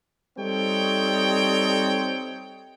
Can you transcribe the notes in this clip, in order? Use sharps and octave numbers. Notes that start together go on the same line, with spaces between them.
G3 C4 D#4 A4 C#5 G5